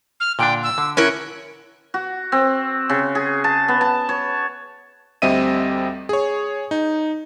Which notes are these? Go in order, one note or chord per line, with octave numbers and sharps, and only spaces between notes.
F6
A#2 D3 D4 G5
E6
D3
C#4 E4 A#4 F#6
F#4
C4
C#3
G#4
A5
B3
A5
C#5
D2 G3 C4 D#5 E5 D#7
G#4 C#5
D#4